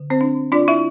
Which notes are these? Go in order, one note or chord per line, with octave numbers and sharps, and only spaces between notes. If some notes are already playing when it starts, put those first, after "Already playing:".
Already playing: D3
C4 C5
D4
D4 F4 D5
E4 E5